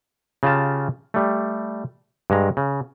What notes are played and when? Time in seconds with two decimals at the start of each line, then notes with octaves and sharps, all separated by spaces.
0.43 C#3 F4 G4 A5
1.14 G3 A3
2.30 G2 G#3 A#5
2.57 C#3